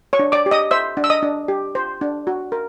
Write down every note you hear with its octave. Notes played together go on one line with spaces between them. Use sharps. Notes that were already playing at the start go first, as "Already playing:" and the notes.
C#5 C#6
D4
D5 D6
G4
D#5 D#6
C5 E5 E6
D4
E6
D#5 D#6
D4
G4
C5
D4
F#4
A#4